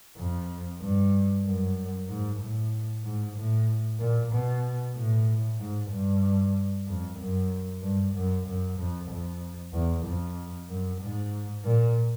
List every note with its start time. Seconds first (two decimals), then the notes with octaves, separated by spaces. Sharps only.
0.17 F2
0.80 G2
1.45 F#2
2.08 G#2
2.40 A2
3.04 G#2
3.37 A2
3.99 A#2
4.32 B2
4.95 A2
5.59 G#2
5.91 G2
6.87 F2
7.19 F#2
7.82 G2
8.14 F#2
8.46 F#2
8.78 F2
9.10 F2
9.73 E2
10.05 F2
10.69 F#2
11.01 G#2
11.65 A#2